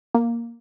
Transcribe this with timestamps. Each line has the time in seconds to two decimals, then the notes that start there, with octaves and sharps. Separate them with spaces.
0.15 A#3